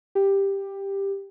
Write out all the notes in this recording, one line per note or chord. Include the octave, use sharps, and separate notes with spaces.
G4